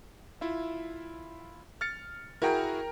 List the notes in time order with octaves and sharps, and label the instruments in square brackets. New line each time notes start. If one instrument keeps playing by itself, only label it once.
[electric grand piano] E4 F4 E5
F6 A6 C#7
[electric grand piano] E4 F#4 G#4 [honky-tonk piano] A#4 G5